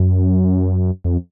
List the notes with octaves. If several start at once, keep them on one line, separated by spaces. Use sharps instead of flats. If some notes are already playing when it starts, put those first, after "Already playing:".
Already playing: F#2
F2